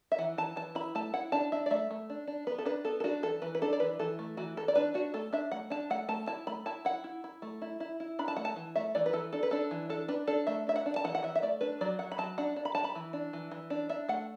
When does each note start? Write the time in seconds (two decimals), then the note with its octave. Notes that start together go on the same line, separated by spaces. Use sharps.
0.12 E5
0.18 E3 F#5
0.38 E3 A5
0.56 E3 A5
0.75 E4 B5
0.95 A3 A5
1.14 E4 F#5
1.32 D4 A5
1.52 D4 E5
1.66 D5
1.70 A3 E5
1.91 A3
2.10 D4
2.27 D4
2.47 B3 B4
2.58 A4
2.66 D4 B4
2.85 B3 A4
3.00 A4
3.04 D4 F#4
3.23 E3 A4
3.42 E3 B4
3.55 B4
3.62 D4 A4
3.73 D5
3.80 E3 B4
3.99 E3 A4
4.19 A3
4.37 E3 F#4
4.57 E3 A4
4.68 D5
4.75 D4 B4
4.94 D4 F#4
5.14 A3 A4
5.33 D4 E5
5.52 A3 F#5
5.70 D4 A5
5.90 A3 F#5
6.08 A3 A5
6.27 E4 A5
6.47 A3 B5
6.66 E4 A5
6.85 E4 F#5
7.04 E4
7.24 E4
7.42 A3
7.62 E4
7.80 E4
8.00 E4
8.19 D4 B5
8.28 A5
8.36 A3 F#5
8.45 A5
8.56 E3
8.75 A3 E5
8.95 E3 D5
9.06 B4
9.13 E3 A4
9.33 D4 A4
9.43 B4
9.51 D4 A4
9.71 E3
9.89 D4 A4
10.08 D4 B4
10.27 D4 A4
10.47 A3 E5
10.67 D4 E5
10.76 F#5
10.86 D4
10.96 A5
11.04 E3 F#5
11.15 F#5
11.23 E3 E5
11.36 E5
11.42 A3 D5
11.61 D4 B4
11.81 F#3 D5
11.99 F#3 F#5
12.12 B5
12.18 F#3 A5
12.38 D4 F#5
12.56 D4
12.65 B5
12.75 D4 A5
12.84 B5
12.95 E3
13.13 D4
13.33 E3
13.51 E3
13.70 D4
13.89 D4 E5
14.08 A3 F#5